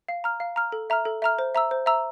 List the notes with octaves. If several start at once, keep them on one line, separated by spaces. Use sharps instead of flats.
F5
A#5 F6
F5
A#5 F6
A4
E5 A#5 F6
A4
E5 A#5 F6
C5
E5 A#5 E6
C5
E5 A#5 E6